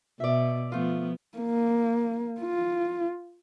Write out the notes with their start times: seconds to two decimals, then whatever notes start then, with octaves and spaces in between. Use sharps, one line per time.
0.20 B2 D5 E5
0.72 F3 A3 B3 F4
1.38 A#3
2.41 F4